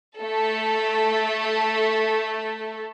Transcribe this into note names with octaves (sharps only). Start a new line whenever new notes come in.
A3 A4